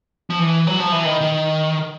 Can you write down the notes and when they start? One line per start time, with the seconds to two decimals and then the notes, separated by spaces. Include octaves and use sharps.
0.30 F3
0.39 E3
0.67 F#3
0.80 F3
0.92 E3
1.05 D#3
1.21 D#3